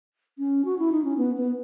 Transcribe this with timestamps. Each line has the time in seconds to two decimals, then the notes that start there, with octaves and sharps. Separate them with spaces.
0.38 C#4
0.65 F#4
0.79 E4
0.92 D#4
1.04 C#4
1.18 B3
1.37 B3